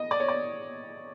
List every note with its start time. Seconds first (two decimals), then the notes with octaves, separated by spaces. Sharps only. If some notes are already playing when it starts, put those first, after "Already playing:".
Already playing: D#5
0.11 D5
0.20 C#5
0.28 D5